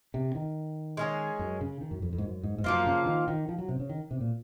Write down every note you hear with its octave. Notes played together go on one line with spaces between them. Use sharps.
C3
D#3
G#3 C#4 G#4
F#2
C#3
D#3
F#2
F2
F2
G#2
F#2
G#2
G#2
F#2 F3 A#3 F4
C#3
D#3
D#3
F3
F#3
C3
C#3
D#3
C3
A#2